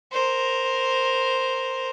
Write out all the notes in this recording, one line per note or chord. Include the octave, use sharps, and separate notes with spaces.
A#4 C5